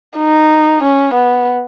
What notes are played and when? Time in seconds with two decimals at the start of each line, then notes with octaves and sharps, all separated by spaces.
0.18 D#4
0.83 C#4
1.14 B3